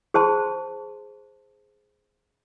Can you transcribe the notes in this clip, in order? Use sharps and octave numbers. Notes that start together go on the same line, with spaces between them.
G#4 C5 A5 C6